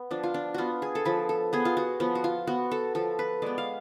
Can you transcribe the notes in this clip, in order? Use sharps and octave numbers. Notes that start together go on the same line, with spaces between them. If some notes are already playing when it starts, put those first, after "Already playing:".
Already playing: B3
F3 D4
F4
D4
B3 F4 F#4
G#4
A4
F3 B4
A4
B3 G#4
F4
F#4
F3 B3
F#4
F4
B3 F#4
A4
F3 A4
B4
G#3 B3 D5
F5